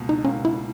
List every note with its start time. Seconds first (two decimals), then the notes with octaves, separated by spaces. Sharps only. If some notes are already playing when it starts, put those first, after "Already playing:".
Already playing: C#2 B2 A#3
0.09 D#4
0.24 C#2 B2 A#3 C#4
0.45 E4